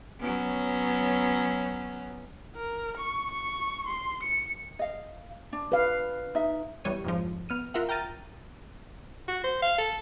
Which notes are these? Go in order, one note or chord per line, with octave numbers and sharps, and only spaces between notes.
F#3 B3 C#4
A#4
C#6
C#6
C6
C#7
D#5 F5
D4
B4 F5
D#4 E5
B1 E3 G3 C#5 D#7
F2 G#2 F3
B3 F6 D#7
F4 A#4 E5 F#5
G5 A#5 F6 A6 D#7
F#4
C5
F5
A4